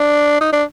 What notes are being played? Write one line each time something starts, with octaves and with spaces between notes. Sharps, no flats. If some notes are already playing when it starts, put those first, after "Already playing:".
Already playing: D4
D#4
D4